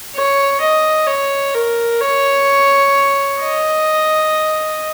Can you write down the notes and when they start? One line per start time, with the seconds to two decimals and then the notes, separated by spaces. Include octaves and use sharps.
0.15 C#5
0.61 D#5
1.07 C#5
1.55 A#4
2.01 C#5
3.41 D#5